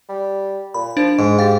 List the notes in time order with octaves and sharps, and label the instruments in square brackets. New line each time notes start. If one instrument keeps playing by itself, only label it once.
[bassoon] G3
[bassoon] A#2 [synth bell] B5
[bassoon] F3 [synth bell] D4
[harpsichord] G#2 [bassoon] G#3
[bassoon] G4 [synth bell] F5 A6